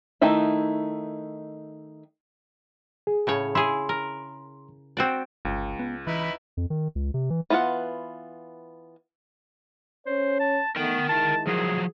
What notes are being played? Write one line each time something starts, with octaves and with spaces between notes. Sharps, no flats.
D#3 A3 D#4 E4
G#4
A2 C#3 C#5
E4 G#4 C6
A#4
C4 F#4 D5
G1 C#2
B3
E3 D#4 E4 B4
F2
D#3
C#2
C3
E3
E3 B3 F4 F#4 F#5
C#4 C5 C#5
A5
A3 B3 D#4 A#4 G5
D#3 G#3 E4 A5
F3 F#3 G#4